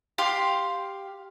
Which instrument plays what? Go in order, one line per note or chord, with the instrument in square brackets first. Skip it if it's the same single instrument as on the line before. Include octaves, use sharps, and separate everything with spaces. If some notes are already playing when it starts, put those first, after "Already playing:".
[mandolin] G4 F5 C6